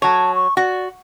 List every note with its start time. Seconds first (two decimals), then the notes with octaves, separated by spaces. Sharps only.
0.02 F#3 C#5 A5
0.34 C#6
0.57 F#4 D5